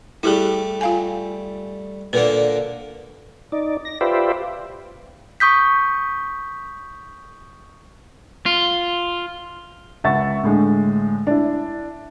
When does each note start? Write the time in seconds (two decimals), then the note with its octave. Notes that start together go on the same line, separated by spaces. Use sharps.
0.23 G3 A3 E4 G4 G#4
0.81 F4 F5 G#5
2.13 A#2 D3 A#3 B4
3.52 D#4 D5
3.85 A#6
4.01 F4 G4 B4 C5 D5 E5
5.40 C#6 D#6 G6 B6
8.46 F4
10.04 C#2 E5 F#5 C#6 A6
10.43 A2 D3 G#3
11.27 D4 E4